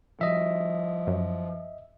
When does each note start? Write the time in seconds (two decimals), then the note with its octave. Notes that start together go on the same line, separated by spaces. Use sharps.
0.21 F3 G3 D#5 E5
1.07 F#2